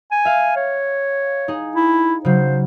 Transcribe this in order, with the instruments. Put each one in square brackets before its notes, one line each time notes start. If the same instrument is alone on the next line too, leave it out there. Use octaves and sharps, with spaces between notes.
[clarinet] G#5
[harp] E5 F5
[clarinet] C#5
[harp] D#4 G#4
[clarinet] E4
[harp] C#3 F#3 [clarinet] C5